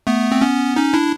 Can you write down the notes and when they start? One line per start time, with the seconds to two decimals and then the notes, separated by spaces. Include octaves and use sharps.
0.07 A3 B3
0.32 C4
0.41 B3 C#4
0.76 C#4 D#4
0.94 D4 E4